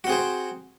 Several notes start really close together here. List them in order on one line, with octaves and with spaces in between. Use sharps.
F#4 C4 G#4 C5